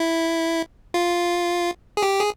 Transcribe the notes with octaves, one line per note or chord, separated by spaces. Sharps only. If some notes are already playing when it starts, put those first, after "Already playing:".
Already playing: E4
F4
G#4
G4
G#4